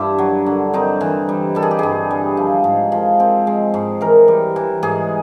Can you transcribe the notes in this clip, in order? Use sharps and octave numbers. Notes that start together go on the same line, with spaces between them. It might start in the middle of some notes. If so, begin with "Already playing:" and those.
Already playing: G2 E4
F#3
D3
C4 D#4
E3
G3
G3 A4
G#4
G4
G2 G#4
G3
F3
G#2
F3
C4
G#3
G#2
E3 A#4
G3
E3
G#2 G#4